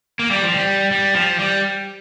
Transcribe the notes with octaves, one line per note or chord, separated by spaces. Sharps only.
A#3
G3
F3
G3
G3
F3
G3